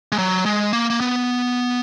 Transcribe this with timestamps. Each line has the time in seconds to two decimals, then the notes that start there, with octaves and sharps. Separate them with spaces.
0.12 G#3
0.18 F#3
0.45 G#3
0.73 A#3
0.90 A#3
1.00 B3